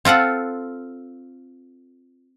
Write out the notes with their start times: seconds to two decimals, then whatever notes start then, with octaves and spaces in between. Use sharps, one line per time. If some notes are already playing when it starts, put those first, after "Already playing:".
0.05 C4 F4 A4 F#5